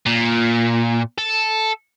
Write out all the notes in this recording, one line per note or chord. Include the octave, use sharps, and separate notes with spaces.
A#2
A4